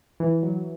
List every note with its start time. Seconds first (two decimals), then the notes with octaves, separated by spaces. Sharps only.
0.20 E3
0.43 F#3